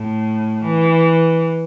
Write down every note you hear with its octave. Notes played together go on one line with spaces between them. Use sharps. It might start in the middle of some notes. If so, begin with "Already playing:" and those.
Already playing: A2
E3